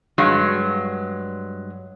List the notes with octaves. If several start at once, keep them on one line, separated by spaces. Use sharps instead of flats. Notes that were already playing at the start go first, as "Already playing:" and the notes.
G2 F#3 G#3